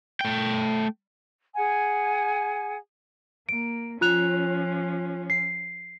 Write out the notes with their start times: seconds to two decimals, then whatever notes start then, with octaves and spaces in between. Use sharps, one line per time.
0.21 A3 G5
1.56 G#4 F#5 G#5
3.49 A#3 D7
4.01 F3 C#4 F4 F#6 F7
5.30 C7